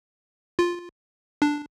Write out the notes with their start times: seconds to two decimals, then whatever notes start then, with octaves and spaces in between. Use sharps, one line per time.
0.59 F4
1.42 D4